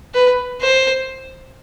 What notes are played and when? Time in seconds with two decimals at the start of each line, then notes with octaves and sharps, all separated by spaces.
0.14 B4
0.61 C5